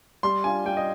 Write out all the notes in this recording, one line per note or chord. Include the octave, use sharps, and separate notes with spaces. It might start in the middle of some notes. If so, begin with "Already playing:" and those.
G3 C6
D4 F4 G#5
G3 G5
D#5